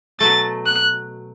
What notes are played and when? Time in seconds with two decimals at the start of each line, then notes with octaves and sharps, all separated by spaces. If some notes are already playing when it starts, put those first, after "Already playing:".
0.20 B2 F#3 A3 A6
0.66 F#6